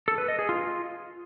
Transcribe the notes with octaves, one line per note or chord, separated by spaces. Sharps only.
A4
B4
D#5
G#4
F4